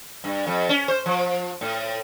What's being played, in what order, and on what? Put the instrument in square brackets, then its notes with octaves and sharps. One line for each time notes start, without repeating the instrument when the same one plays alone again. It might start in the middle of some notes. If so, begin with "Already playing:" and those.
[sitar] G2
F2
C#4
C5
F3
A2